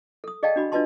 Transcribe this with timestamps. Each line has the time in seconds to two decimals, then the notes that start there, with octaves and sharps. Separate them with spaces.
0.24 A4 D#6
0.43 G#4 D5 D#5 F5 G5 A5
0.56 D4 F#4 B5
0.72 D4 F4 B4 D#5 A5 C6